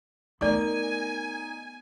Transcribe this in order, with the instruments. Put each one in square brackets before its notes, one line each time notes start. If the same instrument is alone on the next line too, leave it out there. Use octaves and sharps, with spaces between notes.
[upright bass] A3 B3 [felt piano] D#4 A#4 [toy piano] D5 D6 [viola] G#5